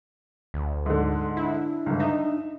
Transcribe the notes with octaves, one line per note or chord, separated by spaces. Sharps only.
D2
G#2 D3
D4 E4
G1 C#2
D#4 E5